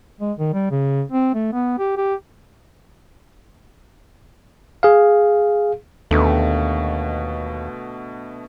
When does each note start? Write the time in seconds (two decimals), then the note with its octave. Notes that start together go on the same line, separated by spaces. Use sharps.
0.21 G#3
0.39 D#3
0.53 G3
0.71 C#3
1.12 C4
1.34 A3
1.53 B3
1.79 G4
1.97 G4
4.83 G#4 F5
6.11 D#2 B2 D3 A3